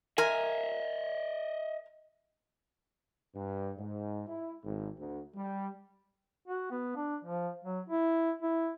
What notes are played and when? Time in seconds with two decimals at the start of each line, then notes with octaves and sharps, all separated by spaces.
0.18 A#4 D#5 E5 G#5
3.35 G2
3.78 G#2
4.28 E4
4.64 G#1
4.99 D2
5.36 G3
6.48 F#4
6.71 B3
6.96 D4
7.25 F3
7.64 F#3
7.89 E4
8.42 E4